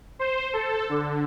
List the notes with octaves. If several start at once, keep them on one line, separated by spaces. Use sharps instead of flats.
C5
A4
D3